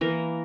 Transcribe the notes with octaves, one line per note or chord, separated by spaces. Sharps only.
E3 A#3 A#4